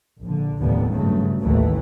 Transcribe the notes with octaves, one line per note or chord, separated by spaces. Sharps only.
A#1 D3
F1 D#2 A2 D3 G3 B3
G2 C#3 F#3 A3
A1 D#2 E3 A3